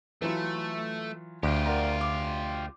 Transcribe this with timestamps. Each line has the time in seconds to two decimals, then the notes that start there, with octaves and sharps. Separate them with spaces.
0.22 E3 F#3 A3 F4
1.43 D2 F4 G4
1.66 A#4 D5 F#5
2.01 D6